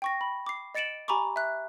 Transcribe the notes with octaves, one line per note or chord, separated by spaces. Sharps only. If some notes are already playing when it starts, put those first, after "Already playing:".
G5 C#6 A#6
B5
D6 C7
D#5 A6 C#7 D7 E7 F#7
G4 G#5 A#5 B5 C#6 D6
E5 F#6